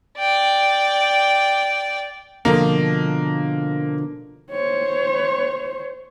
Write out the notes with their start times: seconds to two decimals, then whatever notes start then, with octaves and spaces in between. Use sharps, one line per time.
0.18 D5 G5
2.45 B2 D3 F3 A#3
4.51 C5 C#5